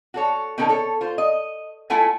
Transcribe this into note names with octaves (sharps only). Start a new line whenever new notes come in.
F#4 A4 C#5
B2 D#3 C#4 D#4 A4 A#4
A4 C#5
F4 C5
D#5
A3 E4 F4 A4 F#5 G#5